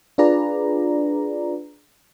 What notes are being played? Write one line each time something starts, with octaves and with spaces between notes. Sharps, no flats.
D4 F4 G#4 B4 D5 A#5